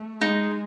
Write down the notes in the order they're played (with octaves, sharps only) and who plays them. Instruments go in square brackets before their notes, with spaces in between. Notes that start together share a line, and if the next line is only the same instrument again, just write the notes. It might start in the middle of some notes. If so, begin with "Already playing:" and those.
Already playing: [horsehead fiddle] A3
[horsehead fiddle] G#3 [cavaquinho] D#4